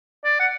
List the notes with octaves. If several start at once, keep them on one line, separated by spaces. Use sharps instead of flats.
D5
F#5